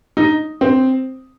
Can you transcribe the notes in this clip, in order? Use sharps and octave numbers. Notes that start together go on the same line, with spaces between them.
D#4
C4